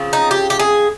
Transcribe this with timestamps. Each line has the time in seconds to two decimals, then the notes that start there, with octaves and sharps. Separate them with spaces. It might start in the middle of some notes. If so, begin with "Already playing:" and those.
Already playing: C#3 F3 C4
0.13 D#4
0.31 G4
0.50 G4
0.59 G#4